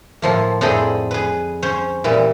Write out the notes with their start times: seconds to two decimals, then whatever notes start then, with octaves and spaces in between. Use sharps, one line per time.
0.22 A2 F3 A#3
0.61 F2 A2 D4 G#4 C5 B5
1.11 G#4 B4
1.62 C#4 C5 C#5
2.04 A#2 E3 G3